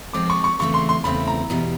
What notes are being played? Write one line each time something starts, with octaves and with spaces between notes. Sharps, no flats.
F3 G#3 C4 D6
C#6
C#6
E2 C#3 E3 A3 C4 C#6
C6
C6
E2 C#3 E3 A3 C4 B5
A#5
E2 B2 G3